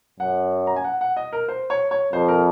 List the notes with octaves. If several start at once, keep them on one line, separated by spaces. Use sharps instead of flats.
F#2 F#5
A#5
G#5
F#5
F#5
D#5
A#4
C5
C#5
C#5
F2 C5
A#4